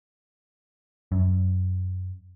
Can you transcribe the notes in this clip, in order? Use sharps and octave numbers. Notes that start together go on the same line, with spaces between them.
F#2